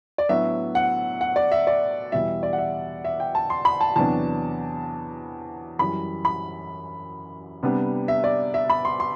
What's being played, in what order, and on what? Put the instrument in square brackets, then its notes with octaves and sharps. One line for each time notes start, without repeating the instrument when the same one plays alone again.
[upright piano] D5
A2 F#3 B3 D4 E5
F#5
F#5
D5
E5
D5
E2 B2 G3 E5
D5
F#5
E5
E5
G5
A5
C6
B5
A5
E2 C3 F#3 B3 D4 A5
F#2 E3 G3 B5
B5
C3 G3 B3 D4
E5
D5
E5
B5
C6
C6